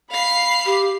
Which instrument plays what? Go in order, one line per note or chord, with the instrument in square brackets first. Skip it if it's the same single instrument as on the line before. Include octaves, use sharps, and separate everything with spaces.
[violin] F5 C7 [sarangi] B5
[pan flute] G4